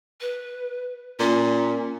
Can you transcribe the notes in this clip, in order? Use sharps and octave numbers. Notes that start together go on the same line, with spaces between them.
B4
A#2 C#4